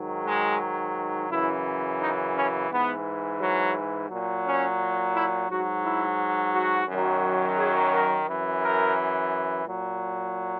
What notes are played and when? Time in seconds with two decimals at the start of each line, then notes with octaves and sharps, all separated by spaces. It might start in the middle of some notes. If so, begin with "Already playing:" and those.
Already playing: G#2 D#3 F#3
0.26 G#3
1.30 F#2 C#3 E3 E4
2.00 D#4
2.35 C#4
2.70 G#2 E3 B3
3.40 F#3
4.09 A#2 F#3
4.44 C#4
5.14 E4
5.48 G#2 F#3 F#4
5.84 E4
6.53 F#4
6.88 F#2 D#3 F#3
7.58 G#4
7.93 A#4
8.28 F#2 E3
8.62 A#4
9.67 A#2 F#3